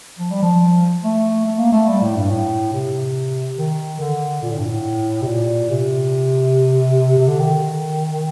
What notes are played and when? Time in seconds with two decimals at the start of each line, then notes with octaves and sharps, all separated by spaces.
0.19 F3
0.31 G3
0.42 F3
1.04 A3
1.45 A3
1.58 A#3
1.72 A3
1.88 G3
2.01 A2
2.17 G2
2.31 A2
2.73 C3
3.57 D#3
4.00 D3
4.42 A#2
4.50 A2
4.58 G2
4.67 A2
5.22 C3
5.27 A#2
5.69 C3
7.18 C3
7.28 D3
7.39 D#3